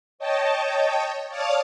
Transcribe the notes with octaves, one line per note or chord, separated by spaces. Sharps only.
C#5 D#5 G5 A5
C#5 D5 F5 A5 D#6 F6